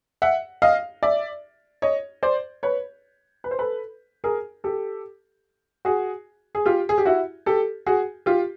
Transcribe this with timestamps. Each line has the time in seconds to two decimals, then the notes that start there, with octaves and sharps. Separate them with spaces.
0.22 E5 F#5
0.62 D#5 F5
1.03 D5 E5
1.82 C#5 D#5
2.23 C5 D5
2.63 B4 C#5
3.44 B4
3.51 C5
3.59 A4 B4
4.24 G#4 A#4
4.64 G4 A4
5.85 F#4 G#4
6.55 G#4
6.66 F4 G4
6.89 G#4
6.98 G4
7.05 E4 F#4
7.46 G4 A4
7.86 F#4 G#4
8.26 F4 G4